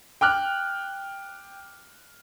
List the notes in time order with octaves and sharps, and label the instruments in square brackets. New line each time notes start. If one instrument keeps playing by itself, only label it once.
[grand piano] G5 D6 F6 F#6